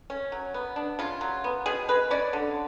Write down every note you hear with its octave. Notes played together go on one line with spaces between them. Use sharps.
C#4
F#3
B3
D4
C#3 F4
F#3
B3
B2 G#4
G#3 B4
C#4 D5
D3